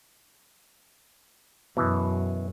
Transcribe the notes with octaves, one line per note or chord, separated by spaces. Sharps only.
F#2 B2 E3